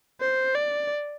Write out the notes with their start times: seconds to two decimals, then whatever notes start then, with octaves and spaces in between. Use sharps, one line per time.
0.21 C5
0.55 D5